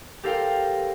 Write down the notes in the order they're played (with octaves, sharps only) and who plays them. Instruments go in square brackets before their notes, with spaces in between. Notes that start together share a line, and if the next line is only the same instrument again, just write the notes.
[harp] G4 A4 A#4 C5 F5 G5